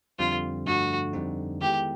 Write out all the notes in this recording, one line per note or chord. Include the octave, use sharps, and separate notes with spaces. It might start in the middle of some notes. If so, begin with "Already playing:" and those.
F2 D3 G3 C4 F4
G2 D3 F3 A3 D4 F#4
F2 D3 G3 C4 D#4
D#3 G#3 B3 E4 G4 A4